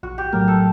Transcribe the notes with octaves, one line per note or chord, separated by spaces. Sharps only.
A#1 F#4
G4
A2 F#3 A3 A#4
A4